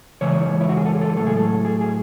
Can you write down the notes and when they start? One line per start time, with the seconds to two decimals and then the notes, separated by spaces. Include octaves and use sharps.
0.21 C#3 E3 G#3 C#5
0.61 E4
0.69 F#4
0.77 G#4
0.86 A4
0.95 G#4
1.01 A4
1.17 A2 F#3 A3 A4
1.27 G#4
1.37 A4
1.65 G#4
1.81 G#4